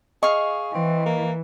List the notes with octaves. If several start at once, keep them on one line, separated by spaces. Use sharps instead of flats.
G#4 D#5 F5 C#6
E3 C4
A#3